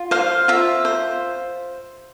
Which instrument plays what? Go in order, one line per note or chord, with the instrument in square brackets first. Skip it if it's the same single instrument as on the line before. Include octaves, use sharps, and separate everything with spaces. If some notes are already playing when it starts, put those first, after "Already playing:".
Already playing: [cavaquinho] F4
C5 F5
F4 E5
C5